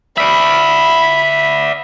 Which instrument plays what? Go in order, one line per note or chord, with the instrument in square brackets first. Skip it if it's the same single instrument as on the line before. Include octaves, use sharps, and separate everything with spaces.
[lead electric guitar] D5 E5 [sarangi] B5